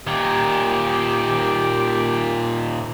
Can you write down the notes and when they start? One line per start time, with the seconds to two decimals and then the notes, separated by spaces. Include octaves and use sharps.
0.07 A#2 D#3 G4